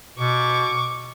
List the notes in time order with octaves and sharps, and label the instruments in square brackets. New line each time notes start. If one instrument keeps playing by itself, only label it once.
[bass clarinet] B2 [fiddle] C#6 D6